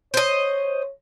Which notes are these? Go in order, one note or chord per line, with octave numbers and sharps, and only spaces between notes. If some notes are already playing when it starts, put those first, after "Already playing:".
C5 C#5 D#5